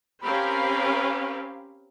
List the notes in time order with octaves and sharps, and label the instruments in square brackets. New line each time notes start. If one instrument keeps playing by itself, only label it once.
[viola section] C4 C#4 G4 A#4 F5 B5